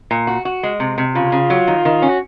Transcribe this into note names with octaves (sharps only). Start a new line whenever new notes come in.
A#2
F#4
F#4
G#3
C3
C3
C#3 F4
C#3
F#3
D#3
D#3
C#4
F#4